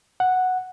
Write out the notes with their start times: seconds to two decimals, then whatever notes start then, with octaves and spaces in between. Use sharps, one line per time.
0.20 F#5